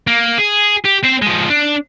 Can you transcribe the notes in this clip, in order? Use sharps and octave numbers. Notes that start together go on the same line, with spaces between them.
A#3
G#4
G4
C4 C5
F3 G#3
D4